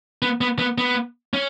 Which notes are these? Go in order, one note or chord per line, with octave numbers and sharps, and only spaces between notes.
B3
B3
B3
B3
C#4